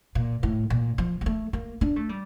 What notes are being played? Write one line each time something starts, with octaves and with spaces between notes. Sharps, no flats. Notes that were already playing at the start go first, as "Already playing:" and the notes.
A#2
A2
A#2
F3
G3
A3
A#3
D4
A3
G3